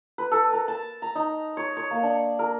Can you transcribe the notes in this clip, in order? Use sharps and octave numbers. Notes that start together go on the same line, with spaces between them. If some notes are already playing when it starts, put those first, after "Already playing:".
B4
A4
A#4
A5
A#5
D#4
C#5
C#5
A#3
D4
A#4